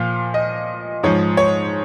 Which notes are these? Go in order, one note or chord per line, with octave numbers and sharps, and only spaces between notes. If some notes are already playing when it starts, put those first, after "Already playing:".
Already playing: A#2 F3 F5
D#5
G#2 F3 C#5
C#5